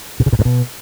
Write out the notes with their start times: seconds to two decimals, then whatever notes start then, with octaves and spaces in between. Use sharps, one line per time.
0.20 B2
0.26 C#3
0.33 A#2
0.39 G2
0.45 B2